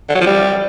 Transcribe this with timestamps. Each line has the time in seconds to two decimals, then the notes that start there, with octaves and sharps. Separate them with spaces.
0.09 D3
0.15 F#3
0.21 F3
0.26 G3